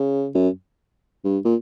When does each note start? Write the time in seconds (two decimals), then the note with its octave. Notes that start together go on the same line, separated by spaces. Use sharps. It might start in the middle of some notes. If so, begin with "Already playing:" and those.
Already playing: C#3
0.35 F#2
1.25 G2
1.45 A#2